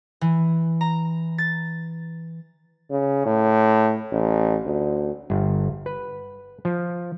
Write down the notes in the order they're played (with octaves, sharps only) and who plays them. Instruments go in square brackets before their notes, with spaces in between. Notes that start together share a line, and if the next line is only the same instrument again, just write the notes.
[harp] E3
A#5
A6
[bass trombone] C#3
A2
A1
D2
[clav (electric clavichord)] G1
B4
F3